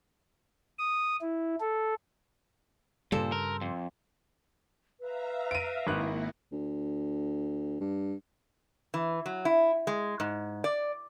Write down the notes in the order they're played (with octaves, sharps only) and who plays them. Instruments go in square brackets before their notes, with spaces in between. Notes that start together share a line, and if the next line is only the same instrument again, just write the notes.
[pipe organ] D#6
E4
A4
[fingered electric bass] G2 C#3 G3 [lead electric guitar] A#2 [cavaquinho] A4 C5
[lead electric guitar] A#4
F2
[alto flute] B4 [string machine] E5 F5 A#5
[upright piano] D7 D#7
[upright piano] G#1 F#6 [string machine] A#3 E4
[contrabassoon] D2
G2
[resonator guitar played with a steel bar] E3
F#3
E4
G#3
G#2
D5